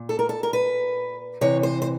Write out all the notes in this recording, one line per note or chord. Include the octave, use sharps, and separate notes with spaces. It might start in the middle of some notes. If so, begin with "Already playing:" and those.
Already playing: A#2
A4
A#4
A4
A#4
B4
C3 E3 C#5
C5
C5